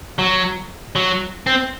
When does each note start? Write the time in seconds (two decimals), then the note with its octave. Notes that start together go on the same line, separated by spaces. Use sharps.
0.19 F#3
0.96 F#3
1.47 C4